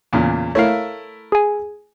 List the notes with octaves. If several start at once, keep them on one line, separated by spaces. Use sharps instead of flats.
E2 A#2 C#3
A3 E4 A#4 C#5 F5
G#4 G#5